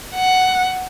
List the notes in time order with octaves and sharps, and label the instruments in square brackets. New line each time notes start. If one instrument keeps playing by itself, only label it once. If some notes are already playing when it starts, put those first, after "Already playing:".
[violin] F#5